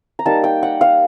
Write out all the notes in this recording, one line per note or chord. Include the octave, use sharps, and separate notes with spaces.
A#5
G3 A#3 D#4 A5
G5
F#5
F5